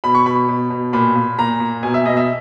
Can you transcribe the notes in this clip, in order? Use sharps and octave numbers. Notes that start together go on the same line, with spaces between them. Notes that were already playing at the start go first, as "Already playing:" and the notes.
B2 B5
C#6
B2 B5
B2
B2
A#2 B5
A#2
A#2 A#5
A#2
B2 G#5
E5
B2 D#5
E5